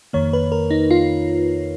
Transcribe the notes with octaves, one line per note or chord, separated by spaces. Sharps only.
F2 D#3 A#3 C#5
B4
A#4
D#4
F4